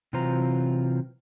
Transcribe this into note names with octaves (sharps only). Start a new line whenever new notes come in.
C3 E3 F#3 F4 C5 A#5